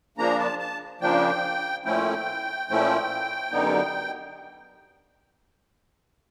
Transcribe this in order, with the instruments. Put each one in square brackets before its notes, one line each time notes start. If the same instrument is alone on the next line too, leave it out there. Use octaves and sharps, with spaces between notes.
[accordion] C#3 F3 A#3 D4 A#5
A5
A5
C#3 F3 A#3 D4 G5
A#2 F3 A3 C#4 E4 G5
A#2 F3 A3 C#4 E4
F#2 D3 G3 B3 D#4